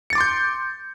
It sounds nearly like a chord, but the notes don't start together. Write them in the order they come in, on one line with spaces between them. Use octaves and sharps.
C#7 A6 D6 C6 G6